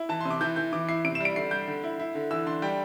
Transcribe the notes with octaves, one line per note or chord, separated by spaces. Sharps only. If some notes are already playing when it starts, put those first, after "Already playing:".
Already playing: E4
E3 A5
C6
C3
D6
E3 G6
E3 G6
E3 D6
E4 C7
C3 D7
E7
G3 D7
D3 C7
G3 G6
D3
E4
E4
D3
E3 E6
D4 C6
G3 G5